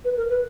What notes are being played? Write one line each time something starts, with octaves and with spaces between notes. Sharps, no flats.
B4
A#4
B4